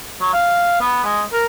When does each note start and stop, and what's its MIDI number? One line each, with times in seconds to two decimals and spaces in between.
0.21 0.29 54
0.33 0.81 77
0.81 1.01 59
1.05 1.22 56
1.33 1.45 70